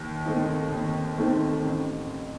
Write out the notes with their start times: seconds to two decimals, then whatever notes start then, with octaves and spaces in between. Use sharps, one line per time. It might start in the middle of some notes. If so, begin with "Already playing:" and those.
Already playing: D#2
0.25 D#3 A3 C4 D#4
0.72 D#2
1.18 D#3 A3 C4 D#4
1.64 A1